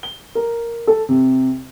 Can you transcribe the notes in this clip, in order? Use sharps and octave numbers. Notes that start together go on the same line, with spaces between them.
G7
A#4
A4
C3